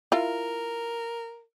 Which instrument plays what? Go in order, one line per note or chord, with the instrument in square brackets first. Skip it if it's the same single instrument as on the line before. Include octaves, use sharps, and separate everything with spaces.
[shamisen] E4 F4 [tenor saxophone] A#4